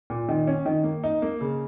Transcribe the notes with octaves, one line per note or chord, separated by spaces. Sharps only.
A#2
D#3
C#4
D#3
A#3
D#4
A#3
C#3